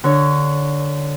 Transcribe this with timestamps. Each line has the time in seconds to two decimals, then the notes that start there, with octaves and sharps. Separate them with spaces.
0.04 D3 C#5